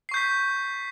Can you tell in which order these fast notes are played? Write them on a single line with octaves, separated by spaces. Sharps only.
C7 C#6 G6 B6